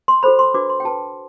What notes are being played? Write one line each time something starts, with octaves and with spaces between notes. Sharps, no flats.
C6
F#4 A4 C5 B5
C6
D4 F#4 B4 D6
C6
G5
F#4 B4 A5